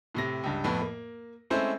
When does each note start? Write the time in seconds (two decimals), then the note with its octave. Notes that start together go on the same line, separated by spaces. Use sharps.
0.15 A2 C3 A#6
0.44 C#2 G2
0.64 F2 A2 B3
0.82 A#3
1.50 G#3 A3 C4 C#4 E4 C5